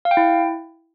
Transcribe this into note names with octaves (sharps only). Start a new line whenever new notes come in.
F5
G5
E4